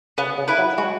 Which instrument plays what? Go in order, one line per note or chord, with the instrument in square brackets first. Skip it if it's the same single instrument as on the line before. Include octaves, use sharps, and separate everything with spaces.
[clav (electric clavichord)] C#3 [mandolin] B3
[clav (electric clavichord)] C#3
[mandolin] E4 B4
[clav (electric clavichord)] F#3
[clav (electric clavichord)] G#3 [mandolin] F#4